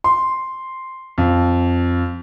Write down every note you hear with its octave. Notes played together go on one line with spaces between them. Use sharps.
C6
F2